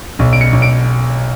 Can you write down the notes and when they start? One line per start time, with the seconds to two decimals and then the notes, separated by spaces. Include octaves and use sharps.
0.19 B1
0.33 D7
0.41 C#7
0.53 B1
0.62 D7